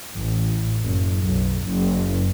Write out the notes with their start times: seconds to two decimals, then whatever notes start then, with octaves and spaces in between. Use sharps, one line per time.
0.15 A1
0.83 F#1
1.19 B1
1.68 F#1